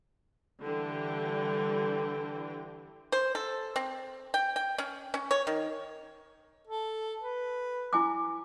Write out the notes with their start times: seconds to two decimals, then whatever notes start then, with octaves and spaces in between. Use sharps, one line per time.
0.62 D3 E3 G3 G5
3.12 C5
3.35 A4
3.76 C4
4.34 G5
4.56 G5
4.78 C#4
5.14 C#4
5.31 C#5
5.47 D#3
6.67 A4
7.22 B4
7.93 E4 G#5 D6